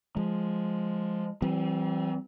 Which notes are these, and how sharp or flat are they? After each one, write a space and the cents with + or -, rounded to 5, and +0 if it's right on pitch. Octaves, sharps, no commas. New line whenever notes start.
F3 +0 G#3 +0
E3 +5 G3 -40 C4 +0